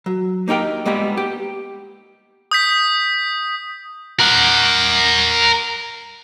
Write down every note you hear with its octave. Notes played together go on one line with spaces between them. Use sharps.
F#3
A#3 D#4 G4 A#4 G5
G3 G#3 A#3 B3 G4
G4
D#6 G6 B6
A#4 F#5